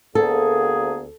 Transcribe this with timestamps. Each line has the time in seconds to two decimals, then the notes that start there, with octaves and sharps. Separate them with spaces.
0.15 D2 D3 A#3 B3 G#4 A4